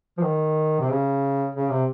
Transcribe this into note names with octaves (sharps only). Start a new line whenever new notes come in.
F3
D#3
C3
C#3
C#3
C3